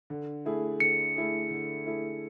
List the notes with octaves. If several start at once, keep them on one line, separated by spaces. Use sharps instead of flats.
D3
A3 E4 G#4
D3 C#7
A3 E4 G#4
D3
A3 E4 G#4